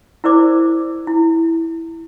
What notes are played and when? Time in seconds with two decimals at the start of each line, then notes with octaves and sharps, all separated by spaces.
0.24 E4 A#4 C5 D5 D6
1.07 E4